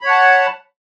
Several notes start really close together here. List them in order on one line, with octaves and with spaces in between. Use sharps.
B5 C#5 F#5 A5